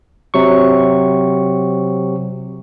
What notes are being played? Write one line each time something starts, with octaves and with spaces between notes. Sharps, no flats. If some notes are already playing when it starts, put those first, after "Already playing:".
C3 F#3 C#6